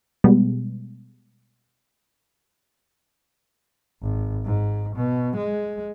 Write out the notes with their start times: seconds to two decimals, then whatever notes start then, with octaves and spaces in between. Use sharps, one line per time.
0.24 B2 G3 G#3 B3
4.02 G#1
4.45 G#2
4.96 B2
5.37 G#3